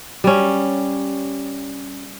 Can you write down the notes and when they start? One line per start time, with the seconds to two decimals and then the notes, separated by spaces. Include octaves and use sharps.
0.24 G3 C#4